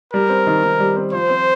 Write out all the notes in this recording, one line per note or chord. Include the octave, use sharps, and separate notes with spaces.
G3 A#4
C4
D#3
D#3
G3
C4
F3 C5
C4